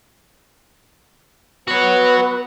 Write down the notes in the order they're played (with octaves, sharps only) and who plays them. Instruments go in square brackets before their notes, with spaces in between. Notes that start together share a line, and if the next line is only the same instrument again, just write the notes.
[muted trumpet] B3 [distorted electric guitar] F#4 C#5 [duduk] B4